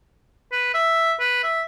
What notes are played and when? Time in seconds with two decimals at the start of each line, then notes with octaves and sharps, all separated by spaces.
0.52 B4
0.74 E5
1.20 B4
1.43 E5